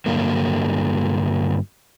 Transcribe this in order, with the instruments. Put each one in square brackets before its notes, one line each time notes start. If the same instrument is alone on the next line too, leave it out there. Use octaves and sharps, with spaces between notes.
[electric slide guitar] G2 D3 F#3 A#3 A#4